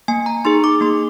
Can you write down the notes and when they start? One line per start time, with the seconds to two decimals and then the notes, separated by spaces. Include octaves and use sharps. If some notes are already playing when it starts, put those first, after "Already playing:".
0.08 A#3 G#5
0.26 A#5
0.45 D#4 G#4 C6
0.64 D6
0.81 A#3 C6